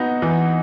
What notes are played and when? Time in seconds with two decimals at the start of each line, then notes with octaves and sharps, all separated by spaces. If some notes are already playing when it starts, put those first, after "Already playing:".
Already playing: B3 D#4 F#4
0.22 E3